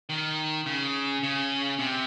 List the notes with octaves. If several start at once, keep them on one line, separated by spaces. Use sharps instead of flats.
D#3
C#3
C#3
C3